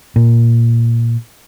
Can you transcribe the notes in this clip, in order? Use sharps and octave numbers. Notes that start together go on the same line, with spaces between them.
A#2